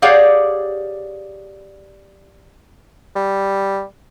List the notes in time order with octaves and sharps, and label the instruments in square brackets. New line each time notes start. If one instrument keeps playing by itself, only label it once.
[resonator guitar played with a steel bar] G4 G#4 C#5 D5 F5 F#5
[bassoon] G3